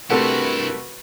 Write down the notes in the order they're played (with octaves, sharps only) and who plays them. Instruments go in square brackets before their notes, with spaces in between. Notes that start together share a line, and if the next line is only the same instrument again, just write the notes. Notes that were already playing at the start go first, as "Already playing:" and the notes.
[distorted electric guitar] G2 E4 [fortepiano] C3 A3 F#5 [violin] F#4 B4 [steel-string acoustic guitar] A#4